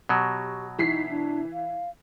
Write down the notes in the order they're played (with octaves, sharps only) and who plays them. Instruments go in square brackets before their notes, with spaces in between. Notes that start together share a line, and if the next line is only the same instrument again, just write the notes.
[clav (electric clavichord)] B2 F#3 [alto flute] G4
[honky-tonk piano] E3 B6 C7 [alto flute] D#4
[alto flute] D4
F5